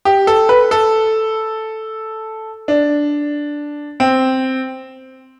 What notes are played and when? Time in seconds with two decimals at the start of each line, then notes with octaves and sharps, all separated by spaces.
0.05 G4
0.27 A4
0.49 B4
0.71 A4
2.68 D4
4.00 C4